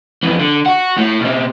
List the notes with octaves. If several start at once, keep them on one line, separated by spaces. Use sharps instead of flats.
F2 E3
D3
F#4 F#5
A2
B2 C4